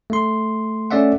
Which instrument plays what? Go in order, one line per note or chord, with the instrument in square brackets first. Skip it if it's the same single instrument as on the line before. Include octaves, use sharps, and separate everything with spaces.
[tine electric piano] A3 C6
A3 C#4 D5 E5 F#5